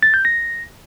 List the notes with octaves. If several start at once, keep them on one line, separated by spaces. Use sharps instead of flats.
A6
G6
A#6